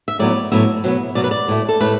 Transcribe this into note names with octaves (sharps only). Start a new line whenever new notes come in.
E5
A2 F#3 B3 D5
A2 F#3 B3 E5
B2 F#3 B3
B2 F#3 B3 D5
B4
D5
A2 A3
A4
A2 A3 B4